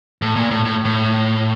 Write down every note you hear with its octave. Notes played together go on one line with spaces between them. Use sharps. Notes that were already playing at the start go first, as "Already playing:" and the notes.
A2
A#2
A2
A2
A2